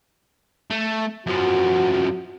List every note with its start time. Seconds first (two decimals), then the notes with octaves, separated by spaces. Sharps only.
0.70 A3
1.27 F#2 F3 F#4